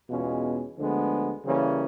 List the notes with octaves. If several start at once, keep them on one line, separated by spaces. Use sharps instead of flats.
E2 B2 G#3 C#4 F4
D2 D3 F3 G#3 B3
C#3 E3 G3 A#3 C#4